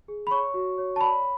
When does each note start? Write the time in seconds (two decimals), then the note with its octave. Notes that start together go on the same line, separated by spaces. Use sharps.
0.08 G#4
0.27 B5
0.31 C#5 C#6
0.54 F#4
0.78 C#5
0.96 A5
1.01 D5 B5